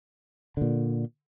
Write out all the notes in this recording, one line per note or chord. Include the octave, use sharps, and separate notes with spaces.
A#2 D3